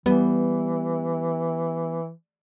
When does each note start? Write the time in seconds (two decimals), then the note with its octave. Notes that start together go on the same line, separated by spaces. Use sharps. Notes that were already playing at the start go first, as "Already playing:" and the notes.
0.06 E3 G3 B3